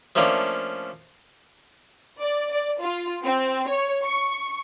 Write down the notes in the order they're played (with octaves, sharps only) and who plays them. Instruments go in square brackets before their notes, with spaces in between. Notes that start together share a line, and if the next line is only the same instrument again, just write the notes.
[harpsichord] F3 A3 A#3 C#4 D4
[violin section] D5
D5
F4
C4
C#5
C#6